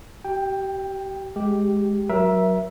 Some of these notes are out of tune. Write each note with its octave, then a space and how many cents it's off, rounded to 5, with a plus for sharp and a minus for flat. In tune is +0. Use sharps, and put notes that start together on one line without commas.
G4 -30 G5 +10
G#3 +0 G4 +0
F#3 +0 A#4 +30 E5 +0